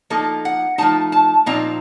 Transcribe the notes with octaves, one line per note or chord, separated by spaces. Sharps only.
F3 A#3 D#4 A4
F#5
F3 A3 D#4 A5
A5
A#2 F3 C4 D#4 A#5